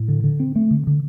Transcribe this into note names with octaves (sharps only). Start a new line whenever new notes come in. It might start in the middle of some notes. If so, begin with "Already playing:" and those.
Already playing: A2
D3
D3
C4
A3
D3
D3